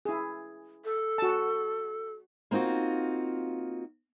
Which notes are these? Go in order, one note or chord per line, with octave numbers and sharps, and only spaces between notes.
E4 G#4
A4
F#4 A5
A#3 C4 D#4 F4 F#4